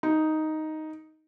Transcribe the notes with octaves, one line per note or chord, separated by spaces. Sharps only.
D#4